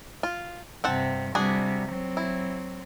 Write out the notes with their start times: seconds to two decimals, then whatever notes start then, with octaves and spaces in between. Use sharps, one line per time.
0.23 F4
0.84 G2 C3 C4 F#5 A5
1.35 C3 G3 D4 F#4 G#4
1.89 F#3 C4
2.17 E4